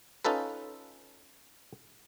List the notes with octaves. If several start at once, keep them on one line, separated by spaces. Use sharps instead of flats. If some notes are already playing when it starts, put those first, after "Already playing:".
C#4 D#4 F4 A4 B4